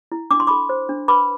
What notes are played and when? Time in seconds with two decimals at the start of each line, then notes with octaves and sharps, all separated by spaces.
0.12 E4
0.31 D4 D6
0.40 C6
0.47 A4 B5 D6
0.69 C5
0.89 D4
1.08 B4 B5 D6